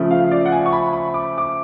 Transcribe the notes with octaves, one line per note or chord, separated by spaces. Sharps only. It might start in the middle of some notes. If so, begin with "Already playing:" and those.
Already playing: C#3 F3 A3
F5
D5
F#5
G#5
C#6
B5
B5
D6
D6